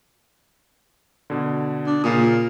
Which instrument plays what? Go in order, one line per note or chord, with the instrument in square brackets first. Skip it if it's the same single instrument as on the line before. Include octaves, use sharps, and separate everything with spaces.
[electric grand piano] B2 D3
[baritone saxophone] D4
[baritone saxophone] A#2 [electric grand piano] C#3 F4 D#6